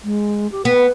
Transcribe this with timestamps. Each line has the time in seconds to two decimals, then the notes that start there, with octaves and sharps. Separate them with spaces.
0.04 G#3
0.51 G4
0.65 B3 B4